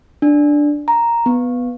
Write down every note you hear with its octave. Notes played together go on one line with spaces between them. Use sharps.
D4
A#5
B3